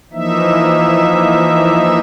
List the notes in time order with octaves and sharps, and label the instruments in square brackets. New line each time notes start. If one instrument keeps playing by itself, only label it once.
[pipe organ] E3 F3 A#3 D#4 E5